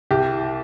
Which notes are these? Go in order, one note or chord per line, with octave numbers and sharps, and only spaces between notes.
C2 G4